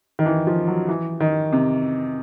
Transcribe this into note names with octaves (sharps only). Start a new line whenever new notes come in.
D#3
E3
F3
F#3
E3
D#3
C3